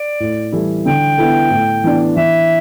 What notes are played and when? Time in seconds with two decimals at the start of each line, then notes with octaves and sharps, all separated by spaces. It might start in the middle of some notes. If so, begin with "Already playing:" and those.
Already playing: D5
0.20 A2
0.52 E3 G3 E4 A4
0.86 D3 G5
1.18 B3 E4 A4
1.51 A2
1.84 E3 B3 D4
2.16 E3 E5